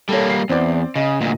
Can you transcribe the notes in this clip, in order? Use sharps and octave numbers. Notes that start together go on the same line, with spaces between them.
G3 A#3 A4 C#5
C7
E2 C4 D5
C#3 D#5
D2 A#2